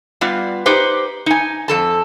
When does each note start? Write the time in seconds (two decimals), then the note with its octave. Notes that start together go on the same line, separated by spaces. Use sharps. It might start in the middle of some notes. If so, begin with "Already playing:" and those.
0.21 G3 B3 F4
0.66 D#4 G4 B4 C5
1.26 D#4 G#5
1.68 F2 A4 A5